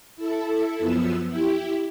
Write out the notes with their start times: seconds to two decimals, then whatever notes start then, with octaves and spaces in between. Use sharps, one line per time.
0.16 E4 A4
0.79 F#2 F3 B3 E6
1.29 E4 G4